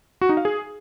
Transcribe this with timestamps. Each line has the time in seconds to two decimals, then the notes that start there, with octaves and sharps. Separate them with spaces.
0.21 F#4
0.29 D#4
0.37 F5
0.45 G#4